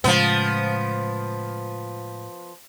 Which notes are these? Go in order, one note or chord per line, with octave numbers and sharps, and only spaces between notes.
A2 C#3 F3 G#3 B3